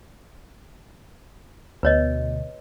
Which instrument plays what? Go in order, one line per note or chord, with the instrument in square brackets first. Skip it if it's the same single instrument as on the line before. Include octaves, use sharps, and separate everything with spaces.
[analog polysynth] D2 B2 [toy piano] B4 C#5 D#5